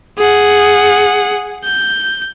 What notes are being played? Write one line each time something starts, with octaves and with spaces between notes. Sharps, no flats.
G#4 F#5
G6